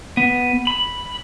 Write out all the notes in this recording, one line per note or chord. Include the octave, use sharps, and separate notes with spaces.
B3
B5